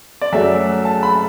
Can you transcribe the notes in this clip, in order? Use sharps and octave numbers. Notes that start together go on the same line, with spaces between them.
D5
F#2 F#3 A3 E5
A5
B5